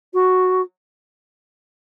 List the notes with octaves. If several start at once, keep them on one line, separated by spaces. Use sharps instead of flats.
F#4